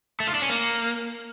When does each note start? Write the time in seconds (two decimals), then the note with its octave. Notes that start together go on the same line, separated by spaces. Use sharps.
0.20 A3
0.27 F4
0.35 D4
0.42 C#4
0.49 A#3